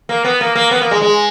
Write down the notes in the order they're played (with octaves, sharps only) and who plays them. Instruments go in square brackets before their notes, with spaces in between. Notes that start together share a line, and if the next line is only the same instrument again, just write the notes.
[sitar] A#3
B3
A#3
A#3
B3
A#3
G#3
G#3